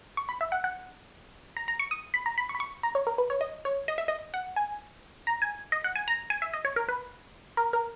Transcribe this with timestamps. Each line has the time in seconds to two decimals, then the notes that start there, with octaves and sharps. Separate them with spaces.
0.17 C#6
0.29 B5
0.41 E5
0.52 F#5
0.64 F#5
1.57 A#5
1.68 A#5
1.79 C#6
1.91 D#6
2.14 B5
2.26 A#5
2.38 B5
2.49 C#6
2.55 B5
2.60 C#6
2.83 A#5
2.95 C#5
3.07 A#4
3.18 B4
3.30 C#5
3.41 D#5
3.65 C#5
3.88 D#5
3.98 E5
4.08 D#5
4.34 F#5
4.56 G#5
5.27 A#5
5.42 G#5
5.72 D#5
5.84 F#5
5.96 G#5
6.08 A#5
6.30 G#5
6.42 E5
6.53 D#5
6.65 C#5
6.76 A#4
6.89 B4
7.57 A#4
7.73 A#4